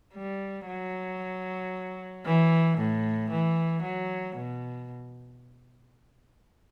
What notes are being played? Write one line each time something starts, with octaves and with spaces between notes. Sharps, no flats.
G3
F#3
E3
A2
E3
F#3
B2